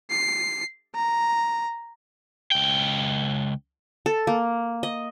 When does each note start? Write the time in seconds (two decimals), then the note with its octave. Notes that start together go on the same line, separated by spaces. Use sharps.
0.10 C7
0.95 A#5
2.52 C#2 G5
4.06 A4
4.27 A#3
4.83 D#5